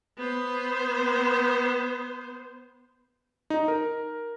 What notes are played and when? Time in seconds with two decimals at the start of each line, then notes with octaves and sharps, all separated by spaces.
0.18 B3 C5
3.50 D#4
3.68 A#4